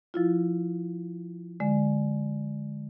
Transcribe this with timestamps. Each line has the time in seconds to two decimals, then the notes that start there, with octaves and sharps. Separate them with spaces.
0.14 F3 E4 F4
1.60 D3 G#3